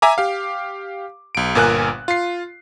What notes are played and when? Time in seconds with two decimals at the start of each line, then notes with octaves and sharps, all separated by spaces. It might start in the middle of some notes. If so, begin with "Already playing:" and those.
0.02 E5 G#5 A#5 D6
0.18 G4 F5
1.35 B1 D7
1.55 G1 A#2 A#4 G#5 F#6
2.08 F4 C7